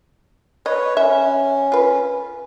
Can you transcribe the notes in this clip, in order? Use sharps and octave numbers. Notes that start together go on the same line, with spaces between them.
B4 C#5 D#5
C#4 E5
F4 B4